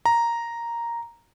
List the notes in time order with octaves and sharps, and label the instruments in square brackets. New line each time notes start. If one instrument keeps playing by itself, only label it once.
[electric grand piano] A#5